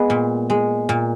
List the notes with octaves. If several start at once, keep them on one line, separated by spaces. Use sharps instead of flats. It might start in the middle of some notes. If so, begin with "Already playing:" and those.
Already playing: G#3 B3
A#2
G#3
A#2